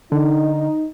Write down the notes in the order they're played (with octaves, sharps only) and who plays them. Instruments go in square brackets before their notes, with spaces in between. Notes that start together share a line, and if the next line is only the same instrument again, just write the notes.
[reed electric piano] D3 [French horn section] D#4